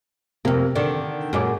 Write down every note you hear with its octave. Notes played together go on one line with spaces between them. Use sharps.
F2 C3 A#3
D3 D#3 D5
F#2 A#2 G#3 C#5 D6